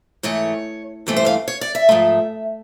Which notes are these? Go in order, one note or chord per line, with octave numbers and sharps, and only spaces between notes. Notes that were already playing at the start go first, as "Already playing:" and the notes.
G#2 E3 A3 C#5
G2 E3 A3 C4
C5
F5
C#5
D5
E5
G#2 F3 A3